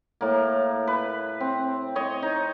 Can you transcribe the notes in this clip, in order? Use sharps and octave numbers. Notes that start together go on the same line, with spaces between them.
A2 A#3
B4
C4
C#5 D#5
D#4